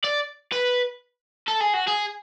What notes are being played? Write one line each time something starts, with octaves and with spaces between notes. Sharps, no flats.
D5
B4
A4
G#4
F#4
G#4